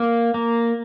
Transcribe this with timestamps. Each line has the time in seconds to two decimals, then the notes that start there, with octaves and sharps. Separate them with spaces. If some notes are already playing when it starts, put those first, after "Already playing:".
Already playing: A#3
0.34 A#3